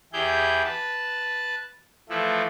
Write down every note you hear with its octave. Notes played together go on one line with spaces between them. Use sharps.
E2 E4 G4 G#4 G6
B4 A5
E3 F3 A3 E4